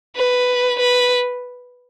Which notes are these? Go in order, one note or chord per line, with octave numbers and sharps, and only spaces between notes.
B4
B4